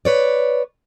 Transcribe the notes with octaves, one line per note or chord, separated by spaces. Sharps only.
B4 C#5 D5